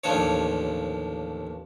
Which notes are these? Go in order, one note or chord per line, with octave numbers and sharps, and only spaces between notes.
A1 D#2 F3 D4 C#5